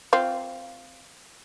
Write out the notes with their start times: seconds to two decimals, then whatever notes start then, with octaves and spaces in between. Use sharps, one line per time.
0.13 C4 F4